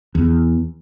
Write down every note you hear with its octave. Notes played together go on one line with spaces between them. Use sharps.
E2